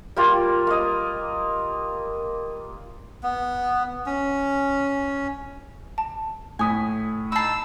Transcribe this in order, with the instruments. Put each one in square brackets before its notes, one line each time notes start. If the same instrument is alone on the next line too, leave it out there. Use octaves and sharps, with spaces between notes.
[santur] G3 A#3 F4
A#3 D#5
[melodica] B3
C#4
[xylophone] A5
[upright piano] A2 D#6 B6 [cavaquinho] G#5
[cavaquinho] D#4 A5 [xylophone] B5 C7 [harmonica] E6